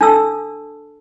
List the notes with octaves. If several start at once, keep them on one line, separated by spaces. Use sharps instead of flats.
D4 A4 A5 E6